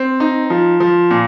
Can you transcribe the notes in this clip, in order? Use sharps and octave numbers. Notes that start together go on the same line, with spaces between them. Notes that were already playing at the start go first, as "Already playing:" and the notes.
Already playing: C4
D#4
F3
F3
A#2